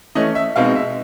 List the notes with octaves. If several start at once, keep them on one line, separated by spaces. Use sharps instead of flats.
E3 A3 C#4 D#5
E5
B2 G#3 C4 D#4 F5
E5